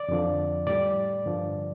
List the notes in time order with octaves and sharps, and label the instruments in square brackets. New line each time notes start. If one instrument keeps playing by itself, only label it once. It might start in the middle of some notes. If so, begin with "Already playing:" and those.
Already playing: [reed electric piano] D5
F2 D3 F3
A2 G3 D5
G2 D3 F3